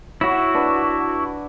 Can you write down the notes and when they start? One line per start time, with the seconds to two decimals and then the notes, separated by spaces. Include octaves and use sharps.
0.21 E4 F#4 C#5 F#5
0.54 D4 B4